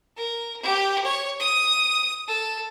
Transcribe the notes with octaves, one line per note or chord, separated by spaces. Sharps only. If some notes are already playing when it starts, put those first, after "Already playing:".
A#4
G4
C#5
D#6
A4